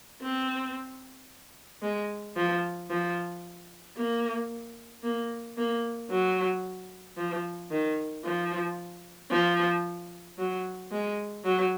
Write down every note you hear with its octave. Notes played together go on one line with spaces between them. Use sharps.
C4
G#3
F3
F3
A#3
A#3
A#3
F#3
F3
D#3
F3
F3
F#3
G#3
F#3